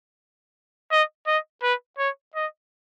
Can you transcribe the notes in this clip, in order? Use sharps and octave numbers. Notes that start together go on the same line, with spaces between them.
D#5
D#5
B4
C#5
D#5